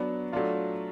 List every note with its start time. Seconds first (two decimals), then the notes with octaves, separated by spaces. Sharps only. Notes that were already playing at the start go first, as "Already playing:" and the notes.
Already playing: F#3 B3 D4
0.32 F#3 A3 D4 F4